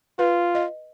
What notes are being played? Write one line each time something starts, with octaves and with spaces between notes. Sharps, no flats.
F4 B4
D#5